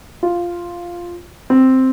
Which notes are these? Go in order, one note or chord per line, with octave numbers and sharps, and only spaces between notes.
F4
C4